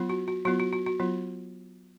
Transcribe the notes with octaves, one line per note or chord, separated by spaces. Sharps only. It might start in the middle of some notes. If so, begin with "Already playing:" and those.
Already playing: F#3 B3 F4
F#4
F#4
F#3 B3 F4 F#4
F#4
F#4
F#4
F#3 B3 F4